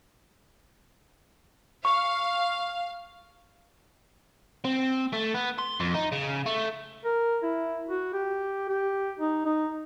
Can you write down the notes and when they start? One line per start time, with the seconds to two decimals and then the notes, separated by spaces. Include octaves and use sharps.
1.85 F5 C#6
4.65 C4
5.13 A3
5.34 B3
5.58 C6
5.80 F2
5.94 D#4
6.12 C#3
6.46 A3
7.05 A#4
7.43 E4
7.88 F#4
8.14 G4
8.69 G4
9.20 D#4
9.46 D#4